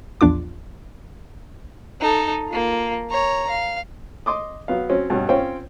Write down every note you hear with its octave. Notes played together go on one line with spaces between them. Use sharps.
A#1 E2 D4 F4 D6
D#4 A4
A#3 F4
C#5 A#5
F5
D#5 C6 D6 D#6
F#3 B3 F5
F#3 C4 C#4
G2 B2 C#4
C4 C#4 F4 C5 C#5 G5